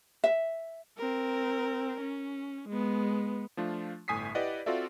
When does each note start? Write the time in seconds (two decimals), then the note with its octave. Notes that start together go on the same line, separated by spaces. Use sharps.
0.24 E5
0.97 C4 A#4
2.01 C#4
2.69 G#3 B3
3.57 F3 A3 D4 F4
4.08 G1 A2 G#5 D#6 B6 C7
4.35 E4 G4 B4 D5 D#5 F#5
4.66 C4 F4 F#4 A4 D5 E5